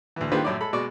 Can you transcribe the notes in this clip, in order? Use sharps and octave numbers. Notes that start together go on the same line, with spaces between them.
D2 E3
D3 D#3 F4 G4 B4 C5
F#2 A2 E4 D5
G#3 A4 B5
B2 G#3 D5 C#6